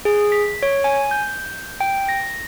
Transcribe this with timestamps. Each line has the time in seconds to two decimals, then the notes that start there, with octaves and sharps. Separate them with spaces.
0.05 G#4
0.32 B6
0.63 C#5
0.84 G#5
1.11 G6
1.80 G5
2.09 A#6